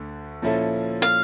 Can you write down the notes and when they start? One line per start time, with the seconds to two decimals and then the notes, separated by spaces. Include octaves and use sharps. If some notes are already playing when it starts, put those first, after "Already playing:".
Already playing: D2 D3
0.42 A#2 F3 C#4 E4 A4
1.02 F5